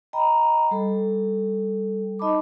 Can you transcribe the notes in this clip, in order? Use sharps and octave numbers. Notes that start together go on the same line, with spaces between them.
D#5 G5 A#5 B5
G3 A4
D#4 D#5 A5 B5 D6